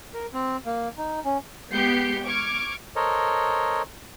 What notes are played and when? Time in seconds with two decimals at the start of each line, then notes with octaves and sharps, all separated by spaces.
0.14 A#4
0.34 C4
0.66 A#3
0.98 D#4
1.25 C#4
1.71 G#3 B3 G4 G6 C7 C#7
2.24 C#6 D6 F6 G#6
2.96 A4 A#4 C5 C#5 D#5